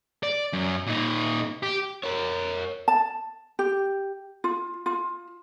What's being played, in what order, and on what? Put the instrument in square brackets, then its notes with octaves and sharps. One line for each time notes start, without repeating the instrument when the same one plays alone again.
[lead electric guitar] D5
F#2
A#2 D#4
G4
[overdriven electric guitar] A#4 C#5
[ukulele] A5
G4
F4
F4